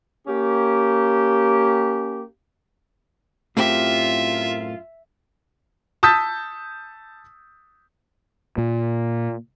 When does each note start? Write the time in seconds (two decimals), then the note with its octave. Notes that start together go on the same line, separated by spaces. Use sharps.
0.27 A#3 C#4 G4
3.57 F#2 A2 C4 F4 G4 E5
6.03 A5 D#6 E6 G6 A6 B6
8.58 A#2